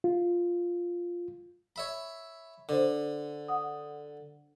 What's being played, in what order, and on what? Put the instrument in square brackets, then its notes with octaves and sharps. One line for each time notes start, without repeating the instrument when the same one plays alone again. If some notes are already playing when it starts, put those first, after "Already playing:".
[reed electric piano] F4
[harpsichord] C#5 E5 B5
[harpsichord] D3 [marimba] D4 C5
[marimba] F#5 D#6